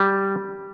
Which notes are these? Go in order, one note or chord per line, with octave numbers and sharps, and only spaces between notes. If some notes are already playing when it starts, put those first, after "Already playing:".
Already playing: G3